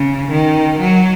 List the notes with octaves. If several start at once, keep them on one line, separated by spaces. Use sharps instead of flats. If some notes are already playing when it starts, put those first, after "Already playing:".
Already playing: C#3
D#3
F#3